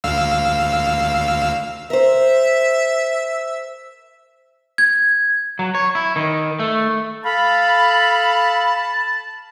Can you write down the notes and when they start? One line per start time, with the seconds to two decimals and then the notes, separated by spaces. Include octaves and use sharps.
0.04 D2 F5 E6
1.90 A#4 C5 E5
4.78 G#6
5.59 F#3
5.75 C#5
5.95 E4
6.16 D#3
6.59 A3
7.24 A4 F5 A5 B5